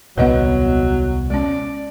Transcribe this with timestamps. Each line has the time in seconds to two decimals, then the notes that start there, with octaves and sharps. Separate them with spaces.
0.18 D#1 C2 F#3 B3 B4 D#5 F#5
1.30 G#3 C#4 D5